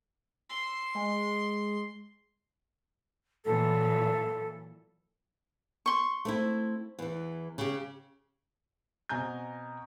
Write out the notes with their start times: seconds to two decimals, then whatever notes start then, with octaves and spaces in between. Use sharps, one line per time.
0.49 C6 E6
0.95 G#3
3.45 A#2 E3 F#3 A4
5.86 C6 C#6
6.25 A3 C4 E4
6.99 E2 E3
7.58 C#3 G4
9.09 B2 C4 G#5 A#5 G6